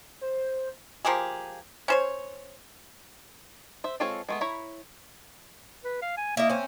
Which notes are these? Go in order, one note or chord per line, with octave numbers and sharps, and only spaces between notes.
C5
F3 A#3 G4 G#4
C#4 C5 C#5
C5 E5
G#3 C4 F4 A4 C#5
G#3 A3 B3
E4 C#5 A#5 B5
B4
F5
G#5
A#3 E4 D#5
C4 C#4